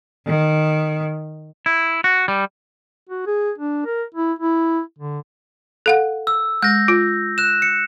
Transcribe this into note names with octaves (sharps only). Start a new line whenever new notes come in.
D#3
E4
F#4
G3
F#4
G#4
D4
A#4
E4
E4
D3
A4 F5 F#5
E6
G#3 G6 A#6
F4
F#6 E7
C#7